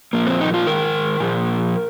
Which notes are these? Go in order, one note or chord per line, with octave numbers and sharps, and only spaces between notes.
A#2 F3 A#3
C4
D#4
F4
G#2 D#3 A#4
A#2 F3